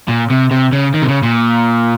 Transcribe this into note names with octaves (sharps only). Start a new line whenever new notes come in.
A#2
C3
C3
C#3
D#3
C3
C#3
A#2